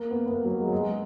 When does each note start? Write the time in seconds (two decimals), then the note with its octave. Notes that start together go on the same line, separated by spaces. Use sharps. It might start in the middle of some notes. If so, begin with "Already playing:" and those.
Already playing: A#3
0.11 B3
0.26 B3
0.31 A#3
0.45 F#3
0.59 G#3
0.67 F#3
0.72 G#3